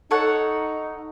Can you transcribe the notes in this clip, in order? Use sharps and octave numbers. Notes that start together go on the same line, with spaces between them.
D#4 A4 C#5 F#5